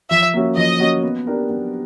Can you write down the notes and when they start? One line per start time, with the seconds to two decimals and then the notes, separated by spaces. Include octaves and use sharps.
0.11 F3 E5
0.34 A#3 C#4 F#4
0.57 F3 D#5
0.79 A#3 C#4 F#4
1.03 B3
1.27 D4 G4 A#4
1.50 B3